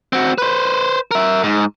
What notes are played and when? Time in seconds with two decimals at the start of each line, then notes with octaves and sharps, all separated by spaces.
0.13 C4 F#4
0.38 B4 C5
1.11 A#4 E5
1.43 G#2